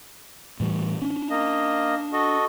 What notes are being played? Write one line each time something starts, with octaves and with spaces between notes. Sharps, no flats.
A2 E3 G3
C#4 D4
A#3 D#5
F#4 A4 D#5